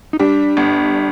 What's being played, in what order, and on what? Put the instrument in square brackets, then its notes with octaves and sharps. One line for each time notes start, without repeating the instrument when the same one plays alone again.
[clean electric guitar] D#4
[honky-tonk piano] G3 [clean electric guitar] D4
[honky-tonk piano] G1